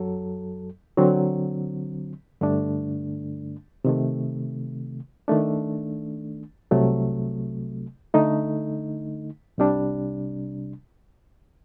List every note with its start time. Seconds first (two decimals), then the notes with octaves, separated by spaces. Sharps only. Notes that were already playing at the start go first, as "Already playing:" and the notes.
Already playing: F#2 F#3 A4
0.98 D3 F#3 C4
2.41 G2 D3 A3 D4
3.85 C3 D#3 A3
5.28 D#3 A3 D4
6.71 C2 C3 F#3 A3
8.14 D3 A3 D#4
9.58 C2 C3 G3 D4